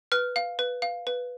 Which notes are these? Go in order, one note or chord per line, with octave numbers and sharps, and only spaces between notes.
B4 F6
F5
B4
F5
B4